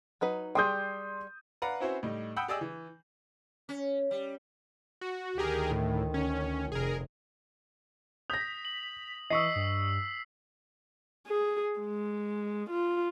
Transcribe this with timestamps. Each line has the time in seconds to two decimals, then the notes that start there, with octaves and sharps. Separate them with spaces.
0.21 F#3 D#4 B4
0.55 G3 G#4 G5 C6 D#6 G6
1.62 B4 D5 F5 F#5 A#5
1.80 C4 C#4 E4 F#4 B4 C5
2.03 A2 G3 D#4
2.36 F#5 G5 B5 D#6 E6 G6
2.48 G4 G#4 D5 D#5 D#6 E6
2.61 E3
3.69 C#4
4.11 G3
5.01 F#4
5.38 D2 D#3 G4 G#4 A#4
5.71 A2
6.14 C#4
6.72 F1 G#4 A#4
8.30 D#6 G6 A#6 B6
8.65 F#7
9.30 E3 D#5 C#6 E6 B6 C7
9.56 G2
11.27 G#4
11.80 G#3
12.70 F4